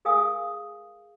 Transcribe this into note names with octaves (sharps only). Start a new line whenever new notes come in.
G#4 A#4 F5 G#5 D#6 E6